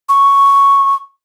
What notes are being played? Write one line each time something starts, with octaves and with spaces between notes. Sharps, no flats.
C#6